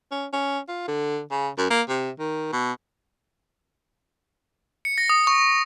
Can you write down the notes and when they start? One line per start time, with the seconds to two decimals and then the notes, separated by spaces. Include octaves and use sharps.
0.12 C#4
0.33 C#4
0.69 F4
0.88 D3
1.31 C#3
1.58 F#2
1.71 A#3
1.89 C3
2.19 D#3
2.53 B2
4.85 C#7
4.98 A#6
5.10 D#6
5.27 C#6